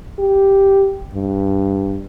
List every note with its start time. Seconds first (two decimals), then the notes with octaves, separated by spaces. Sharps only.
0.19 G4
1.15 G2